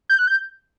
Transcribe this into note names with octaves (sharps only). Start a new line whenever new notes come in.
G6
F#6
G6